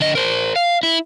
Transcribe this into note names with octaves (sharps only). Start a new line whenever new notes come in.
D3 D#5
A#4 C5
F5
E4